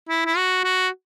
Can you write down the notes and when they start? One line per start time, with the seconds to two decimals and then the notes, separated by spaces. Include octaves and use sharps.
0.09 E4
0.26 E4
0.37 F#4
0.64 F#4